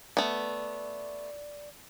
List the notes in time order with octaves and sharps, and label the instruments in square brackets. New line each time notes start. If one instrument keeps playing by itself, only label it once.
[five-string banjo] A3 B3 [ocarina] D5